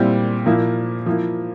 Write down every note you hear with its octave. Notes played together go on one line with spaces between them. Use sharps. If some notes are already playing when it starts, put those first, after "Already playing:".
Already playing: A#2 G3 C4 E4
A#2 F3 A#3 E4
F3 A#3 E4